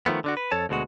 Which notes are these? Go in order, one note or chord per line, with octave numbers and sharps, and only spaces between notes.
D#3 F3 A3 B3
D3 D4 F#4
B4
F2 A4 C#5 A5
D2 B2 G#3 F#4